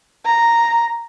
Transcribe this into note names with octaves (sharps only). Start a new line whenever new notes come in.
A#5